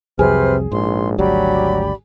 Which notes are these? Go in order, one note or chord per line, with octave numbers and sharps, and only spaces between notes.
C2 F2 C3 F#3 G#4 B4 C5 F6
A#1 G#2 C6
G#1 D2 F#3 G3 G4 D5 B5